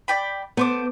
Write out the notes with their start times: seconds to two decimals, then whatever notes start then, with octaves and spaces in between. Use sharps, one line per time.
0.08 D5 G5 B5
0.57 A3 B3 C5 D6